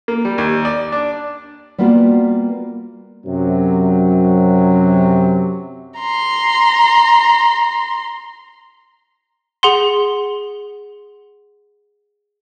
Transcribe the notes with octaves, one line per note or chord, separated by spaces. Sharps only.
A#3
G3
D#2
D5
D4
G3 A#3 B3 F4 F#4
F#2 C3 F#3
A#5 C6
G#4 F#5 C6